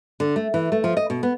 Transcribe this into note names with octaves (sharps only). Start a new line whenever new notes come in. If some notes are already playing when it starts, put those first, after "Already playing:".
D3
A3
E3
A3
F3
D#5
B2
B3